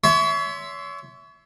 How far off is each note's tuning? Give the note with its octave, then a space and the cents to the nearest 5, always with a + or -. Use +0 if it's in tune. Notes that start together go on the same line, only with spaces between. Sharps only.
C#5 +35 E5 +0 C6 +0